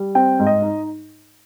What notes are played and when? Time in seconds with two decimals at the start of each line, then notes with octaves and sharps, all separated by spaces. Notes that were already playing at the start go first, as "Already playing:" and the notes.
Already playing: G3
0.15 C4 G5
0.39 G#2
0.46 D#5
0.62 D#4